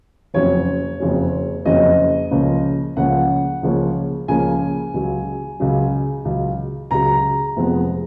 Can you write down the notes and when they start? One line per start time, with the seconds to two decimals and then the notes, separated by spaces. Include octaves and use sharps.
0.34 F#1 F2 C#3 F#3 C#4 C#5
1.00 F#1 F2 C#3 F#3 C#4
1.66 F#1 F2 C#3 F#3 C#4 D#5
2.31 C#2 C#3 F3 A#3 C#4
2.97 C#2 C#3 F3 A#3 C#4 F#5
3.62 C#2 C#3 F3 A#3 C#4
4.28 C#2 C#3 F3 A#3 C#4 G#5
4.94 C#2 C#3 F#3
5.60 C#2 C#3 F#3
6.25 C#2 C#3 F#3
6.91 C#2 C#3 F#3 A#5
7.57 F1 F2 F3 G#3 B3